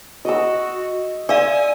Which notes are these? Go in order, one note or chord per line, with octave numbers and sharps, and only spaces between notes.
F#4 D#5 E6
D5 E5 F5 G#5